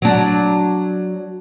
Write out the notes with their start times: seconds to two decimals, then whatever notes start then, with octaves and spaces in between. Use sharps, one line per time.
0.02 F#3 D4